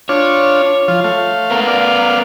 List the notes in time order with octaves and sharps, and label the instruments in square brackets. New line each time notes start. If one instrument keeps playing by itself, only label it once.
[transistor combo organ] D4 F4 [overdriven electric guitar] C#5
[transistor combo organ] F3 F4
A3 F5
[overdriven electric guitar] B3 A#4
[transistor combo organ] D5 F5